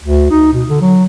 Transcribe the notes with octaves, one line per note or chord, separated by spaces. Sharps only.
D2
D#4
B2
D3
F#3